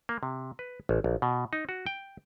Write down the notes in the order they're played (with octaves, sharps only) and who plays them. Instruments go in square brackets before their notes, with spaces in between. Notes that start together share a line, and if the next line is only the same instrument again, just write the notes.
[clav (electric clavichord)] A#3
C3
B4
A1
A#1
B2
D#4
F#4
G5